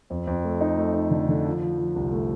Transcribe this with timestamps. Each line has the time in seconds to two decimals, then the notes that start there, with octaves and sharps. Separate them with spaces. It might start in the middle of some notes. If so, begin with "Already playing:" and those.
0.10 F2
0.27 F2
0.45 A3
0.61 D#4
0.77 A3
0.94 D#4
1.11 D3
1.29 D3
1.46 F3
1.62 F3
1.78 F3
1.96 C2
2.12 A3